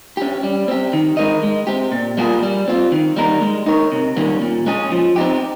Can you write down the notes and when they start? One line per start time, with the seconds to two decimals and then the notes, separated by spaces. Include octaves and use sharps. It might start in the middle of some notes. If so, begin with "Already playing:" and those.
0.17 C#4 G4
0.43 G3
0.68 C4 G4
0.93 D#3
1.17 G#3 D#4 A#4 D#5
1.43 G#3
1.67 C4 G4
1.92 A#2
2.17 G3 A#3 F4 G#4
2.43 G3
2.68 C4 F4
2.92 D#3
3.16 G3 A#3 D#4 A#4
3.42 G#3
3.66 D#4 A#4 C#5
3.92 C3
4.17 D#3 G3 A#3 C#4
4.42 A#2
4.66 G#3 C#4 G#4
4.92 F3
5.16 C4 D#4 G4